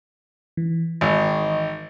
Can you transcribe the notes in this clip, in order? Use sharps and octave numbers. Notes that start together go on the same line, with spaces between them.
E3
G#1 G#2 D#3